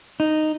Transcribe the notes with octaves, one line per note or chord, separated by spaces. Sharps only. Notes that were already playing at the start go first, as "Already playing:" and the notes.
D#4